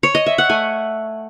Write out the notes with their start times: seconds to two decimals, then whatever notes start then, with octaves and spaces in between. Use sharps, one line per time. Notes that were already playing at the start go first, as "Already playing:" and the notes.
0.03 C#5
0.15 D#5
0.26 E5
0.38 F#5
0.49 A3 G#5